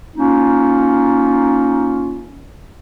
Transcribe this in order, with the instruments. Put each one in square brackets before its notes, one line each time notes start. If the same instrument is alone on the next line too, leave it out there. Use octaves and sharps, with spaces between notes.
[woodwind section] A#3 C#4 D#4 F4